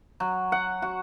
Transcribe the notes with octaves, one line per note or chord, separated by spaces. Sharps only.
F#3
F#5
F#4